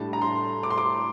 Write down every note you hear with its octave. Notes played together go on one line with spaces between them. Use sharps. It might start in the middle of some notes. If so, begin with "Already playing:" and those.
Already playing: A2 G3 D4 A5
A#5
C6
D6
C6
D6